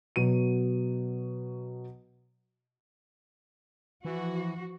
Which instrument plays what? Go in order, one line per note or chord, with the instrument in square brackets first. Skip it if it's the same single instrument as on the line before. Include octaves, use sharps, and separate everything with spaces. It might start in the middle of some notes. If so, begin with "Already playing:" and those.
[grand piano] B2 F#3 D#7
[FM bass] E3 [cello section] F3 F#4